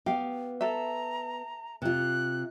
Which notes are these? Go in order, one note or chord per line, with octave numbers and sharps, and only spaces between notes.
B3 G4 F5
A4 E5 A#5
C3 F4 F#6